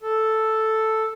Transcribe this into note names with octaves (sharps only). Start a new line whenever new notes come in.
A4